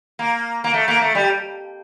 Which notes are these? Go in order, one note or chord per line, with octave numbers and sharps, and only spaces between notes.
A#3
A#3
A3
A#3
A3
G3